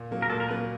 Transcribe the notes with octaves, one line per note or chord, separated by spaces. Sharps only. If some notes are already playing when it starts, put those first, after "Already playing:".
Already playing: A#2
F#3 A#3
A#4
A#2 A4
A#4
F#3 A#3 B4